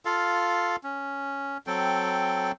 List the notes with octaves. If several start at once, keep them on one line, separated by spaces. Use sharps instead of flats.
F4 A4 F5
C#4
F#3 C4 A4 G5